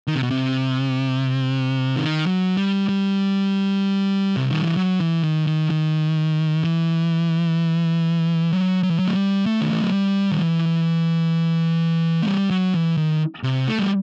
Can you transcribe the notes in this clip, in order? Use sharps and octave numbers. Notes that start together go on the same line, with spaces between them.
D#3
C3
B2
C3
D#3
F#3
G3
G3
C3
D#3
E3
F#3
E3
D#3
D#3
D#3
E3
F#3
F#3
E3
F#3
A3
G3
A3
D#3
E3
F#3
G3
D#3
E3
A3
G3
F#3
E3
D#3
C3
A3
G3